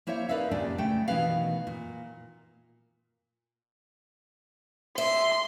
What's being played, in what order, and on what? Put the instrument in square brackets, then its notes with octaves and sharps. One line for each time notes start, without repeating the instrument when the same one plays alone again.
[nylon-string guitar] A#3 E4 C5 C#5 E5 F5
D#4 A#4 B4 D5 E5 F5
D#2 A#2 C#3 D4 G#4 D5
C#3 A3 G5
B2 D#3 E3 A3 B4 F5
A#2
[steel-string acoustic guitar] E5 [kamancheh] C6